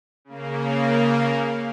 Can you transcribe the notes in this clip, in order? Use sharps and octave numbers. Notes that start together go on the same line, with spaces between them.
C#3 A#3